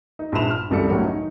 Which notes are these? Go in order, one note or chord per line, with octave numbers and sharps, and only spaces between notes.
D#4
A#1 G2 B5 C6 E7 F7
F6
F#1 C2 G3 A4 D5 C#7
C#2 A2 D#3 F#3 C#4
D#4